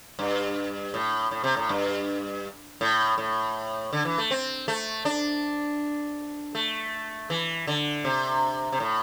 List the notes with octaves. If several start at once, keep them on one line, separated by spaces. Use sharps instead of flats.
G2
A2
A2
C3
A2
G2
A2
A2
D3
E3
A3
C4
A3
D4
A3
E3
D3
C3
C3
A2